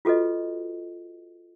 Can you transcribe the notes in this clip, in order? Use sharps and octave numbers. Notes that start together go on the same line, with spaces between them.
F4 F#4 A4 B4 D#5